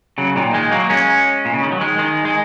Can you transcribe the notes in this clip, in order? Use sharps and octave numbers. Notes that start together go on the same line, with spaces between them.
C#3 F#3
A#2 D#3
D#3 G#3
F#3 A#3
G#3 C#4
A#2
C#3
D#3
F#3
D#3 G#3
D#3 G#3
G#3